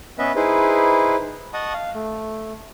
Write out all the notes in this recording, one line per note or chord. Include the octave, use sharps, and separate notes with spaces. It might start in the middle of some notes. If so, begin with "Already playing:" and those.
B3 C#4 B4 D#5 E5
D#4 E4 G#4 B4 C5
D#5 F#5 A5 C#6 D#6
F5
A3